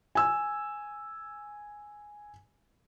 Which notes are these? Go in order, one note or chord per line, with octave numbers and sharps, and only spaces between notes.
G#5 E6